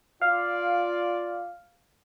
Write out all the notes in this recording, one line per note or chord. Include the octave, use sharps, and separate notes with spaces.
F4 D5 F5